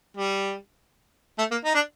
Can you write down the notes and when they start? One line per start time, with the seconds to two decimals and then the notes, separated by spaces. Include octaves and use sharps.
0.17 G3
1.38 A3
1.51 A#3
1.65 D#4
1.74 D4